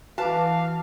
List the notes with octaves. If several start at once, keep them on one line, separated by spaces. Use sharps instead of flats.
E3 F#4 B4 F5 A5 D6